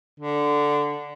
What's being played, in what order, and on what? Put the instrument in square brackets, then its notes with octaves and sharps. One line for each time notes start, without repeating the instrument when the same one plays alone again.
[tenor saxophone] D3